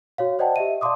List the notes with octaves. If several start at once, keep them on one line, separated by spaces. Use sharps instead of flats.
F#4 C#5 F5
C5 D5 D#5 F#5 G5 A5
G4 D#5 E5 D#7
D5 F5 A5 C6 D6 D#6